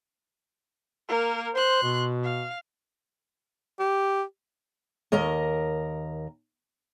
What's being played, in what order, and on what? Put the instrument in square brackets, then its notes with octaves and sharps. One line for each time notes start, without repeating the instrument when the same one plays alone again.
[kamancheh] A#3 A#4
[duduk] C5 [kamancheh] C6 F#6
[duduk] B2
[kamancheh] F5
[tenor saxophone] G4
[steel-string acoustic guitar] D#2 A#4 D#5 A#5